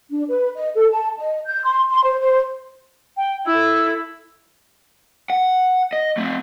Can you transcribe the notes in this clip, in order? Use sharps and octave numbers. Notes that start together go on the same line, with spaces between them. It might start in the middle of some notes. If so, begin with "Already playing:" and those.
D4
B4
D#5
A4
A5
D#5
G6
C6
C6
C5
C5
G5
E4 A4 E6
F#5
D#5
A3 C4